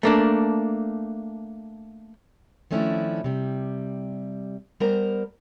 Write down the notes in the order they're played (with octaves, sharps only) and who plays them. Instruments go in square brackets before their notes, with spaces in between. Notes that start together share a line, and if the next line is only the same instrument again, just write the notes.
[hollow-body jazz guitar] A3 A#3 D4
[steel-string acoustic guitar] D#3 F3 A3 C#4 D4 E4
C3 G3
G3 B3 A#4 C5 A#5